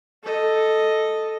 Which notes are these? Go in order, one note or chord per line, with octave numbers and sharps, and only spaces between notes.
A4 D#5